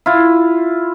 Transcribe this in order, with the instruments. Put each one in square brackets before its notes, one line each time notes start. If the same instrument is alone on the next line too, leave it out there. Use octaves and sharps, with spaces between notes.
[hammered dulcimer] E4 F4